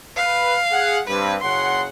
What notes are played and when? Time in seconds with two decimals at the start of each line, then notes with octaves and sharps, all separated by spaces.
0.17 B4 F5
0.71 G#4 F#5
1.08 G2 C4 B4
1.41 F#1 C#3 F#5 C6